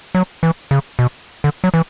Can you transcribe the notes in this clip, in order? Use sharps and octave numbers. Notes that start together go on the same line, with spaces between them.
F#3
E3
C#3
B2
D3
F#3
E3